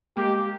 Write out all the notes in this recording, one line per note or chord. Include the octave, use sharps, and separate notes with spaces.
G#3 A#3 G4